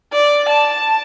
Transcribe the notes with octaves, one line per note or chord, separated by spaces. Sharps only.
D5
A5